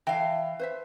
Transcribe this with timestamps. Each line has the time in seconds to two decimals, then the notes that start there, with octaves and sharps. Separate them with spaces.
0.07 E3 F5 G5 A5
0.59 B4 C5 E5